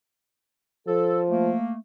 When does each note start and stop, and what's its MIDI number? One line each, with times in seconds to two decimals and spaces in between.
0.88 1.52 53
0.88 1.21 69
1.30 1.77 57
1.30 1.77 58